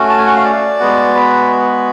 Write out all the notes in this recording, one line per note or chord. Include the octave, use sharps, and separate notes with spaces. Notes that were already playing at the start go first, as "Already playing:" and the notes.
Already playing: A3 C#4 F#4
A5
G#5
F#5
F5
D5
G#3 B3 F#4
B4